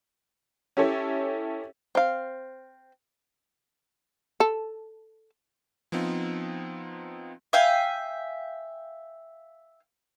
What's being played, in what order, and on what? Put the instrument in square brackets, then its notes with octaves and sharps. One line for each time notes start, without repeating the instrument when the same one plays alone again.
[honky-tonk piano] C#4 E4 G4 A4 C#5
[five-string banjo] C4 F5
[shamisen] A4
[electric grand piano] F3 B3 C4 D#4 F4
[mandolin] E5 F5 G5 G#5